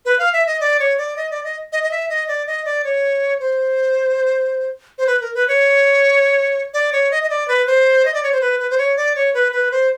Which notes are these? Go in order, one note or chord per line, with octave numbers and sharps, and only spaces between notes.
B4
F5
E5
D#5
D5
C#5
D5
D#5
D5
D#5
D#5
D#5
E5
D#5
D5
D#5
D5
C#5
C5
C5
B4
A#4
B4
C#5
D5
C#5
D#5
D#5
D5
B4
C5
D#5
D5
C#5
C5
B4
B4
C5
C#5
D5
C#5
B4
B4
C5